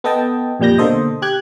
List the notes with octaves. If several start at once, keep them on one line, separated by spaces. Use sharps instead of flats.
B3 A4 D#5 G5 A5
F2 A#2 G3 G6 A#6
B2 D3 A#3 A4 C5 D#5
G4 G5 F#6 G#6